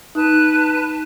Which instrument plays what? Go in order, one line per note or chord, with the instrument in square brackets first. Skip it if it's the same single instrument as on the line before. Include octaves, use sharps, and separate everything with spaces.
[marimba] D#4 [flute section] B4 A5 F#6